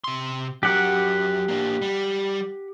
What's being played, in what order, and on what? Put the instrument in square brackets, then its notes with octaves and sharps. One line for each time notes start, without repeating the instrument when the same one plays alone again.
[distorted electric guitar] C3 C6
[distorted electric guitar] F#3 A#4 [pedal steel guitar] G4 F#5
[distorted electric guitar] A#3 D4
G3